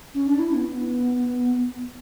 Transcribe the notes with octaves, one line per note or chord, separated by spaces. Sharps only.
C#4
D4
E4
C#4
B3